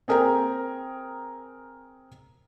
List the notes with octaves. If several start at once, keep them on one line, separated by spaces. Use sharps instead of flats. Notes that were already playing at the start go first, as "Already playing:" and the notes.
C4 G#4 A#4 G5 A#5